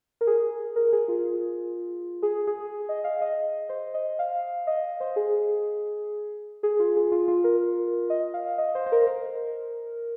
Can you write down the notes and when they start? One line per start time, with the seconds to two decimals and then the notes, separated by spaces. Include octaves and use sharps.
0.21 A#4
0.27 G#4
0.76 A#4
0.93 G#4
1.08 F4
2.22 G#4
2.47 G#4
2.89 D#5
3.04 F5
3.21 D#5
3.69 C5
3.94 D#5
4.19 F5
4.67 D#5
5.00 C5
5.16 G#4
6.63 G#4
6.79 F4
6.96 G#4
7.11 F4
7.28 F4
7.44 A#4
8.10 D#5
8.34 F5
8.58 D#5
8.75 C5
8.86 C5
8.92 A#4
9.02 C5
9.07 A#4